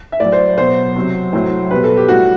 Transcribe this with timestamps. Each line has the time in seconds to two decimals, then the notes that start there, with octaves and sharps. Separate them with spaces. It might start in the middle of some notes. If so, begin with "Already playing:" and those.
0.12 E5
0.20 A2 F#3 D5
0.32 C5
0.57 B2 F#3 C5
0.96 C3 F#3
1.33 A2 F#3
1.71 B2 G3 B4
1.84 A4
1.97 G4
2.08 A2 G3 F#4